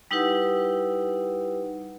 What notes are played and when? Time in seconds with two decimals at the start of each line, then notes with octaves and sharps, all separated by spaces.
0.11 G3 D#4 E4 G4 B4 F#5